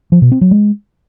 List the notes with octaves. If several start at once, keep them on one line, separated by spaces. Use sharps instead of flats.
F3
B2
C4
F#3
G#3